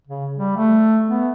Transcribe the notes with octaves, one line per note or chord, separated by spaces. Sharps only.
C#3
G3
A3
B3